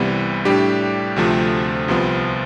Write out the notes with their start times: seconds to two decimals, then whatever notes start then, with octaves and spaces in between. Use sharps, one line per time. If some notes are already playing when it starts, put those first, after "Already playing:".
Already playing: C2 C3 E3 G3 B3
0.45 A2 G3 D4 G4
1.16 D2 C3 F3 A3 C4
1.88 C2 C3 F3 B3